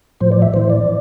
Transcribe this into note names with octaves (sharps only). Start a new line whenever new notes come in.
A2 F3 C5
D5
E5
A2 E3 C5
D5